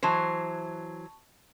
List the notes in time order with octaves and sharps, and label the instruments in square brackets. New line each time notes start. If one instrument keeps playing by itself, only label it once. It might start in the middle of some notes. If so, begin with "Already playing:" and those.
[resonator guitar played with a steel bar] E3 F#3 C5 [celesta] A5 C#6 E7